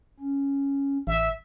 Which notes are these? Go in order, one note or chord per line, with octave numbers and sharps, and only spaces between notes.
C#4
A1 E5